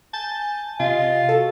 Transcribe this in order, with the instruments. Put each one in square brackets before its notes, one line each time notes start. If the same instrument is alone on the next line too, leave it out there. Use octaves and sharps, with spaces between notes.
[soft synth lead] G#5 [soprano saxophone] A5 [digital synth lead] G6
[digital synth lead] C3 [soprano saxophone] F4 [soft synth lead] D#5
[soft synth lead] F#4 [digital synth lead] A4